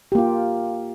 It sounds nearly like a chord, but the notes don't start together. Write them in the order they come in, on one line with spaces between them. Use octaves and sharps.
G4 A#3 F4